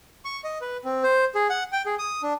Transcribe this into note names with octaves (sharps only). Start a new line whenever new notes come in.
C#6
D#5
B4
C4
C5
G#4
F#5
G5
G#4
D#6
D4